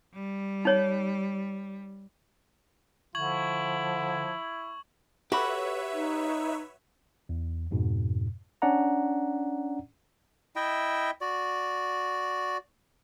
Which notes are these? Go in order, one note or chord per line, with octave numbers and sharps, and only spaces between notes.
G3
D#4 C#5
D3 F3 E4 C#6 G#6 F#7
F#4 G4 A4 B4 C#5 E5 B5
D#4
E2
F2 G#2 B2
C#4 D4 D5 F#5 A#5
E4 D#5 E5 G5
F#4 D5